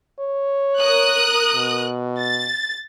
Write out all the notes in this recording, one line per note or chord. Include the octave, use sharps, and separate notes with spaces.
C#5
A#4 D#6 F#6
B2
A6